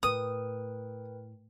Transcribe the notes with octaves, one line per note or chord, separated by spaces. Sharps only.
A2 A#4 B4 G5 D#6